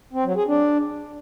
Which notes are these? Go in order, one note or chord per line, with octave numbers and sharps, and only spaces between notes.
C4
F#3
G#4
D4